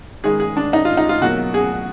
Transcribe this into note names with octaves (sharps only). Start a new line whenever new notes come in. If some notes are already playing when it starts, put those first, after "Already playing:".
D#3 G#3 G#4
G#4
D4
D#4
F4
D#4
F4
B2 F#3 A#3 F#4
G#4